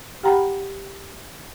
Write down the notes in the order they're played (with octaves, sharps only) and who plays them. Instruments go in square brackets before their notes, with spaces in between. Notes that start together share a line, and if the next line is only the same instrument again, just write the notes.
[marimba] G4 F#5 G5 A#5 B5